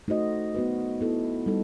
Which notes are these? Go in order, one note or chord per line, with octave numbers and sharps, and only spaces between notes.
A3 D#4 F#4 C5 D#5
B3 F#4 B4
B3 E4 A4
G3 D#4 A4